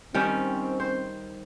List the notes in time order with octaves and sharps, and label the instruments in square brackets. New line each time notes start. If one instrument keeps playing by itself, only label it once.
[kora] D#3 G3 C#4 [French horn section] C4
[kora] C5